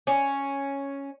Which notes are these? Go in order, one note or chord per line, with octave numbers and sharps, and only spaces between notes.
C#4